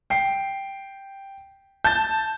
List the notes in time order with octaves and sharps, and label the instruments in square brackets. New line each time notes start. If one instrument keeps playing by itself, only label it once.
[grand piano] G5 C7
[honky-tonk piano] A5 A6 [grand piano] G6